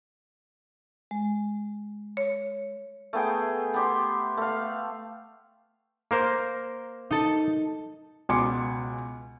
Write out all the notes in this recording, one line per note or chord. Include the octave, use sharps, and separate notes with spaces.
G#3
C#5
A3 B3 G#4 G5
B3 G4 C6
A3 F5
A#3 A#4 C5
D#4 A4
C#2 B2 G#5 C6 D6 C#7